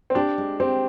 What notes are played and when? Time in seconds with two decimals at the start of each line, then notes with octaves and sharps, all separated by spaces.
0.10 C4
0.15 D4 G4
0.38 G#3
0.60 C4 G4